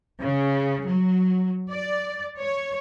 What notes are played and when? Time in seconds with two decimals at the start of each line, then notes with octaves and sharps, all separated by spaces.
0.21 C#3
0.86 F#3
1.70 D5
2.37 C#5